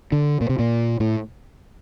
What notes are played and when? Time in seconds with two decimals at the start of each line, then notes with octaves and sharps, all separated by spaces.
0.12 D3
0.41 A#2
0.49 C3
0.59 A#2
1.00 A2